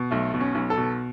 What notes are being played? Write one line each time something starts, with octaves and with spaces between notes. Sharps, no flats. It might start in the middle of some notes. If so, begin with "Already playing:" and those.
Already playing: B2
B1 A3
B2
C#4
B1
A4
B2